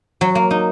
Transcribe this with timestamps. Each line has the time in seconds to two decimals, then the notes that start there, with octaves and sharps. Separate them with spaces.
0.21 F#3
0.35 A#3
0.51 D#4